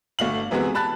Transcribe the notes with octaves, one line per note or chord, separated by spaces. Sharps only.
G1 A3 F#4 F5 F#7
C3 E3 G#3 B3 C4 F#4
A5 B5 F#6 A6